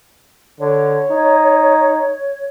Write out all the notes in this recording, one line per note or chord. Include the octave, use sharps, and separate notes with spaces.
D3 C#5
D#4